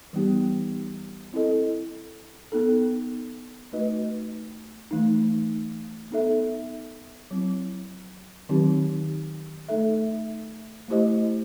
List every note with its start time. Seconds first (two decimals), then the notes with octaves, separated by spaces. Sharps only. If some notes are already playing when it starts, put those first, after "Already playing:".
0.13 E3 G3 B3 D#4 G4
1.33 C4 E4 A4 D#5
2.52 B3 D#4 A4
3.72 A3 D#4 F#4 B4 D#5
4.91 E3 A3 D#4
6.11 B3 D#4 A4 E5
7.31 F#3 C4 E4
8.49 D#3 F#3 C4 D#4 G4
9.69 A3 D#4 A4 E5
10.88 A3 E4 G4 C5 D#5